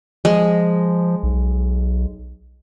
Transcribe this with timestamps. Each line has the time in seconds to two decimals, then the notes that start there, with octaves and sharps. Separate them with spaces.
0.25 F3 G#3
1.23 B1